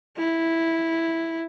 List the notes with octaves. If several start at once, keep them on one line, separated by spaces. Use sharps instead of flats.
E4